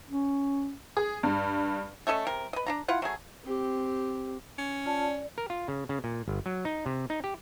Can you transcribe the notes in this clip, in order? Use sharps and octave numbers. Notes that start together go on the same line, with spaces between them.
C#4
G#4
G2
A3 C#4 A4 D#5
C3 A#4
B4 D#5
D4 F4 A#5
E4 F4 F#5
F#3 A3 G#4
C4 G4
C#4
F4 D5 A5
D5
A#4
F4
C#3
C#3
A#2
G1
F#3
D#4
C3
D#4
G4